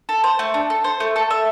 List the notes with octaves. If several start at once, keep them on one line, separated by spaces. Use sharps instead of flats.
A4
C5
A3
D4
A4
C5
A3
A4
E5